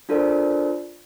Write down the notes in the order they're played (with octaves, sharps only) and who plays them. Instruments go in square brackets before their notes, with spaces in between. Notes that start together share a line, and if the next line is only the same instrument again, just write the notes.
[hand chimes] D4 F4 A4 A#4 C5 D5